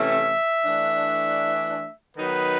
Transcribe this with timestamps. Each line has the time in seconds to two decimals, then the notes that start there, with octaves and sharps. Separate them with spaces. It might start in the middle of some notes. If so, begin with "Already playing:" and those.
Already playing: C3 E3 A3 C#4 E5
0.64 E3 A3 D4
2.16 D#3 F#3 B3 D#4 B4